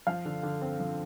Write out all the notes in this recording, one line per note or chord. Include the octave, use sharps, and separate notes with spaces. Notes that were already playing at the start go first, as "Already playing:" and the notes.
F3 F5
D3
D3
C4
F3